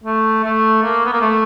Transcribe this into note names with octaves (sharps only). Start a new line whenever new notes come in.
A3
A3
A#3
B3
A#3
A3